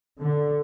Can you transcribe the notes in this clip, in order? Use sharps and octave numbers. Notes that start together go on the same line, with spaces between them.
D3